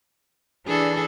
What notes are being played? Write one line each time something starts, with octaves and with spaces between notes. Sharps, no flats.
E3 D4 G#4 A4